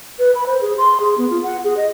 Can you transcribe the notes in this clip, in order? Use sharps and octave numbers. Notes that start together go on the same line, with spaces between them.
B4
B5
C5
G#4
C6
G#4
B3
F4
F#5
G#4
D#5